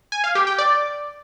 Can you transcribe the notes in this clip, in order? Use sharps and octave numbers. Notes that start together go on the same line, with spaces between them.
G#5
F5
G4
G5
D5